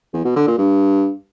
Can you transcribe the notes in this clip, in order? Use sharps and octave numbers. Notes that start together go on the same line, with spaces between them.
E2
B2
D3
A#2
G2